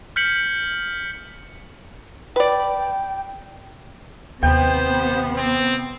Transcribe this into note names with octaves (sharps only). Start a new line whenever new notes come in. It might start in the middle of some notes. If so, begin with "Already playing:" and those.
F6 G6 B6 C#7 F#7
B4 D5 G5
D#2 C3 B3 C5 G5
C4